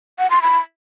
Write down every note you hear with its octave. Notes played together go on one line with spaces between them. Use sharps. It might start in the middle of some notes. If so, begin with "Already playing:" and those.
F#5
C6
B5